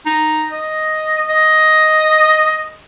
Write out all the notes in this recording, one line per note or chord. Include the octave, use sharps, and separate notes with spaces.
D#4
D#5
D#5